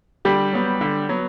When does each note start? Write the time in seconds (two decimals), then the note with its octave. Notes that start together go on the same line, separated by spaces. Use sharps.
0.25 D3 G3 G4
0.53 F#3 B3
0.81 D3
1.09 F#3 B3